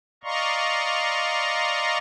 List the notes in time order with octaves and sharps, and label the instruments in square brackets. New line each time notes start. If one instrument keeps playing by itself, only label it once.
[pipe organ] D5 D#5 F5 A#5 C6 C#6